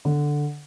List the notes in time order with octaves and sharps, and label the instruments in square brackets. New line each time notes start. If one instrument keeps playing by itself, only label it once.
[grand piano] D3